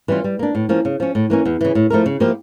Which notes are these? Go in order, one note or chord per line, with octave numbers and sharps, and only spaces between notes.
E3 G3 C#4 F4
G3
A#3 D4
A2
F3 A#3 C#4
C#3
F3 C#4
A2
E3 A#3 C#4
E2
C#3 E3
A2
F3 A3 E4 A#4
C#3
F3 A#3 E4 G4